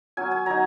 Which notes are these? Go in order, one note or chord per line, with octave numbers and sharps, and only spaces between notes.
F#3 C#4 G#5
G#5
F#3 D#4 A#5